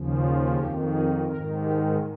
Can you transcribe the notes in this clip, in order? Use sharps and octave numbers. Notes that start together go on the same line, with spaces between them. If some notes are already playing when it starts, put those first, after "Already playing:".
Already playing: D#2 C#3 F3
F4
F2 D#3 G4
G#4
G#2 D#3 A#4
G4